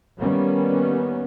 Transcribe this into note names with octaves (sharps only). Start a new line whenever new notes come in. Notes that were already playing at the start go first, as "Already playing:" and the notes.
D#3 G3 A#3 B3 C#4